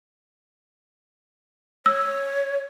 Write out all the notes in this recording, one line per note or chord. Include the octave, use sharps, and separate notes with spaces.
C#5 E6